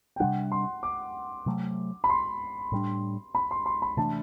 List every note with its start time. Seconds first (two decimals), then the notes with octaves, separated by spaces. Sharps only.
0.16 G5
0.20 C3 G3 D4 F#5
0.52 C6
0.83 D6
1.46 C3 F#3 A3
2.04 B5
2.09 C6
2.72 A2 G3 D4
3.35 B5
3.51 C6
3.66 C6
3.82 B5
3.97 C3 E3 A3 D4 A5